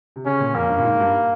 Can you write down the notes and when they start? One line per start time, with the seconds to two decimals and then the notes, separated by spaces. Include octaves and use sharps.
0.16 C3
0.26 C#3 C#4
0.40 A#2
0.55 F2 A#3
0.69 G2
0.78 A#2
0.84 G#2
1.00 G2